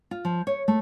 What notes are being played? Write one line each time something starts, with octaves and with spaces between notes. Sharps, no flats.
F4
F3
C#5
A3